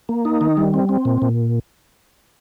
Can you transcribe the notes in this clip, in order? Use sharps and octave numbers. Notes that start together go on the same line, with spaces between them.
A#3
D#4
D#3
G3
C4
C4
A#2
A#2